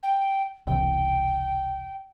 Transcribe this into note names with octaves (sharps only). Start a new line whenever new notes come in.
G5
E1 C2 E3 G5